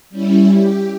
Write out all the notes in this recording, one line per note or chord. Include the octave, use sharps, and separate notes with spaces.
G3 C#4 E4
G4